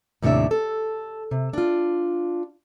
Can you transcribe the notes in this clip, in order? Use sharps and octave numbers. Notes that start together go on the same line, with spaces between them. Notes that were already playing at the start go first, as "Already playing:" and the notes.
D#2 A2 C3 D4 E5
A4
C3
D4 F4